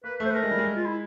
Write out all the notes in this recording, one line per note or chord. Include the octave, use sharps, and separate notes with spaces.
A#3 B4
A3
C5
B4
A3 A#4
G#3
G3
G#3
F4
E4